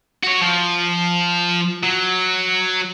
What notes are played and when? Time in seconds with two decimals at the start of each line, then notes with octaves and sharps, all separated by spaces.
0.24 F#4 C#5
0.41 F3
1.83 F#3